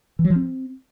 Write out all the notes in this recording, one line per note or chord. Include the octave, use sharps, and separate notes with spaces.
E3
F#3
F3
C4